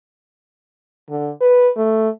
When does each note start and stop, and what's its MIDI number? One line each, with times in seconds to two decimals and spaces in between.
1.09 1.31 50
1.41 1.68 71
1.77 2.09 57